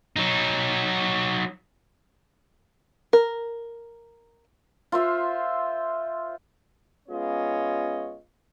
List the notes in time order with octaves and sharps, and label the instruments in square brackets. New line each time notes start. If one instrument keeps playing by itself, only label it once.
[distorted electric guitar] F#3 D#4
[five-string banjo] A#4
[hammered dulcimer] F4 C5 E5
[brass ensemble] G#3 B3 C#4 F4 C#5 D#5